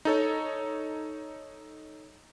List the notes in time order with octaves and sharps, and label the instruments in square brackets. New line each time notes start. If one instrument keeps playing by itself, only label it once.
[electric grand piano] D#4 A4 C#5